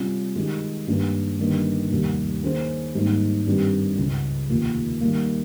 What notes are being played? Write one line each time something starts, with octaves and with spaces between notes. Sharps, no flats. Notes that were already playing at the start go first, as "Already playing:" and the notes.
Already playing: C3 G3 C#4 F4
D#3 G#3 D#4 G4
G2 D#3 A#3 C#4 G4
G1 G2 D#3 A#3
F1 D#2 D#3 G3
D#3 A#3 C#4 G#4 C5
G#1 G#2 G3 A#3 D#4
G2 D#3 G3 C4 G4
C#2 C#3 G#3 C#4
F1 D#2 D#3 A#3 F4
D#3 G3 A#3